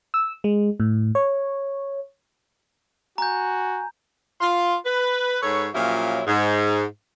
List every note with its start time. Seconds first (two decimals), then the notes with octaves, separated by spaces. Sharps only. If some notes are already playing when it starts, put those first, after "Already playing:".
0.14 E6
0.44 G#3
0.80 A2
1.15 C#5
3.18 F#4 G#5 A#5 G6
4.41 F4 C6
4.86 B4
5.42 G#2 A4 B4 C#5
5.74 A#2 F3 F#3 C#4 E4 G4
6.27 G#2